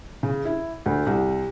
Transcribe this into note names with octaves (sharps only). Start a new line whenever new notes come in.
C#3
E4
D2
C2